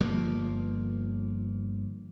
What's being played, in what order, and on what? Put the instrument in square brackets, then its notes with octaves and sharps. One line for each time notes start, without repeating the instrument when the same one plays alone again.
[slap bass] G1 F3 A#3